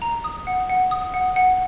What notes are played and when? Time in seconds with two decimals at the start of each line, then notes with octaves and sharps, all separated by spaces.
0.02 A#5
0.24 D#6
0.47 F#5
0.70 F#5
0.91 D#6
1.14 F#5
1.36 F#5